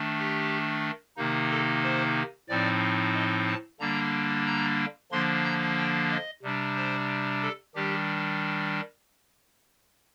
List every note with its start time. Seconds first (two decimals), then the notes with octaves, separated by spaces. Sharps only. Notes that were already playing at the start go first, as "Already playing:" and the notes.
Already playing: D#3 A3 D4
0.18 G4
1.17 C3 D#3 A#3 D#4
1.51 A4
1.83 C5
2.48 A2 F3 C4 D#4 D5
3.15 D#5
3.47 A5
3.80 D3 G3 A#3 D4 A#5
4.46 A#5
5.12 D3 F3 A#3 D4 C6
5.44 A#5
5.77 G5
6.11 D#5
6.43 C3 G3 D4
6.76 C5
7.42 A4
7.75 D#3 G3 D4 G4